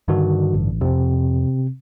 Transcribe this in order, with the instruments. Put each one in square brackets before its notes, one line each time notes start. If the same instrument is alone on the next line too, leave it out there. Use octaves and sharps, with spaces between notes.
[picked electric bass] G2 D3 [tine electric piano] D#3 F#4
[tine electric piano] A1
[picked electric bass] F2 [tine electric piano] C3 C4